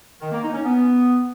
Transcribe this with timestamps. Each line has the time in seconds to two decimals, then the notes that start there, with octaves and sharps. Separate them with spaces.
0.21 D#3
0.31 A#3
0.42 D#4
0.53 C#4
0.64 B3